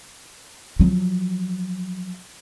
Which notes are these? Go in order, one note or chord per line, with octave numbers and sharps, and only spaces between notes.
F3 F#3